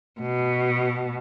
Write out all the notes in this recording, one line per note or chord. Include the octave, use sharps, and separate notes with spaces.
B2